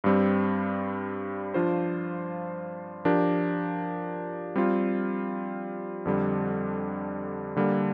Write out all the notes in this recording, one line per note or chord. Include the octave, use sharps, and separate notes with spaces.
G2 G3 C4
F3 D4 F4 C5
F3 D4 G4 A#4
G3 C4 F4
F2 D3 G3
D3 G3 A#3